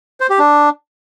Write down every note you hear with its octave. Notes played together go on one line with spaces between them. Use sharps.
C5
G4
D4